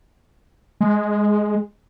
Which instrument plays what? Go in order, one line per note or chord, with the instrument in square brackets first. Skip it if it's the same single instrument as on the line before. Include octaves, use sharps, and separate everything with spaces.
[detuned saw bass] G#3